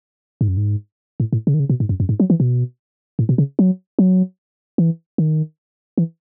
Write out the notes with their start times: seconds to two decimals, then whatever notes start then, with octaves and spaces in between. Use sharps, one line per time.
0.41 G#2
0.48 F#2
0.57 G#2
1.20 A2
1.33 A2
1.47 C#3
1.54 D#3
1.60 C#3
1.70 B2
1.80 G#2
1.89 F#2
2.00 F#2
2.09 G#2
2.20 F#3
2.30 E3
2.40 B2
3.19 A2
3.29 B2
3.38 C#3
3.59 F#3
3.99 F#3
4.78 E3
5.18 D#3
5.98 E3